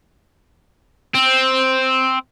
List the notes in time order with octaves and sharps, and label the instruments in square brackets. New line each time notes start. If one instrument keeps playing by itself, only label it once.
[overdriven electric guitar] C4